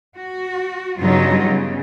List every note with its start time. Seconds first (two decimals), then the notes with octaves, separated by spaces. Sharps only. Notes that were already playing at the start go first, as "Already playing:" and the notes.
0.17 F#4
0.99 G2 C#3 F#3 B3 D#4 F4
1.45 C#3